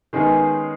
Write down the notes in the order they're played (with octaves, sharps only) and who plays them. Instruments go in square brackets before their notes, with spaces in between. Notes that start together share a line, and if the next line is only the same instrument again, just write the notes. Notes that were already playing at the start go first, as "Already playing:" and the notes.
[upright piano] D#3 G#3 B3 D#4 G#4 [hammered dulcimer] C#4